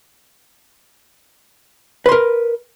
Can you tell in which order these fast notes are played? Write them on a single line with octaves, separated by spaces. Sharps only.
B4 C6 A#4